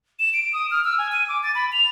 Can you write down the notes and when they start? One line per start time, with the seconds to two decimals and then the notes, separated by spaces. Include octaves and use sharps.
0.19 E7
0.33 D7
0.53 D#6
0.71 F6
0.84 E6
0.98 G#5
1.12 D#7
1.28 D6
1.43 A6
1.55 B5
1.72 F7